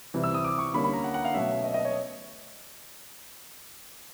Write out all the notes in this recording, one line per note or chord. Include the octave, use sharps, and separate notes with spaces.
C3 E3 G3
E6
D#6
D6
C#6
D3 G3 A#3 C#4 B5
B5
A#5
F#5
F#5
F5
B2 F#3 A3 C#4 E5
D#5
D#5
C#5